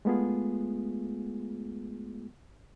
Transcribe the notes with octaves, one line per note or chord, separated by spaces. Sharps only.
G#3 A3 B3 F4 G#4